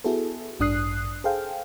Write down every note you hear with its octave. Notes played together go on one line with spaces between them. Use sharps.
B3 E4 F#4 G#4 A4
A1 G2 D4 D#6 F#6 C7
G#4 A4 C5 F5 G5